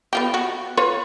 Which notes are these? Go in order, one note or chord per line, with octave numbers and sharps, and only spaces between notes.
B3 F4 G4
F#4
F4 B4 C#5